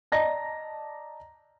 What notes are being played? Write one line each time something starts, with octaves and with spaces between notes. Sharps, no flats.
D5 D#5 A5 A#5 A#6